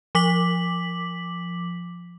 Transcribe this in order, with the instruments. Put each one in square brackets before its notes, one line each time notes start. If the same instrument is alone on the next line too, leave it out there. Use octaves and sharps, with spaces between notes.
[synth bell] F3 D6 B6 F#7